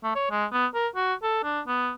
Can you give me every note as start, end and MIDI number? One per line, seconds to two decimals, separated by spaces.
0.03 0.11 57
0.15 0.28 73
0.31 0.45 56
0.52 0.66 59
0.74 0.88 70
0.95 1.14 66
1.23 1.43 69
1.44 1.61 62
1.67 1.92 59